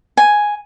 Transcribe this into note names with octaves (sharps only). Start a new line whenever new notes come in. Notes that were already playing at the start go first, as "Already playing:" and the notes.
G#5